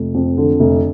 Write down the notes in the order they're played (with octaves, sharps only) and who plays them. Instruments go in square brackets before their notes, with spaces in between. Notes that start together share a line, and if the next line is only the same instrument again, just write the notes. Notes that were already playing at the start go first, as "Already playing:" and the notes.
Already playing: [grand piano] F1
F2
D3
F1